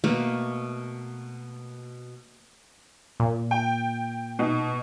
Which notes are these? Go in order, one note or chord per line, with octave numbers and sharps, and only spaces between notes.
B2 A3 A#3
A#2
G5
B2 D#4